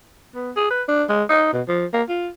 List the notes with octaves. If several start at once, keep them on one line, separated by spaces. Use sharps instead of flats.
B3
G#4
B4
D4
G#3
D#4
B2
F3
A#3
F4